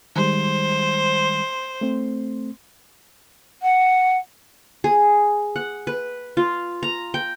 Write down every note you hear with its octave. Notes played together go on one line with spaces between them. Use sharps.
D#3 G3 G#3 C5
A3 C4
F#5
G#4
F#5
B4
F4
A#5
G5